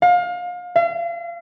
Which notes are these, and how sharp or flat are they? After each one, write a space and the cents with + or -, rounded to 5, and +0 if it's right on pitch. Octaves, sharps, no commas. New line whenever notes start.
F5 +30
F5 -40